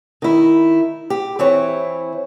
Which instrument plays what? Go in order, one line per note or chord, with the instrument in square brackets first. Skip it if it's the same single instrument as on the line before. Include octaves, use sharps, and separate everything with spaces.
[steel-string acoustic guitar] D#3 E4
G4
E3 C4 E4 C#5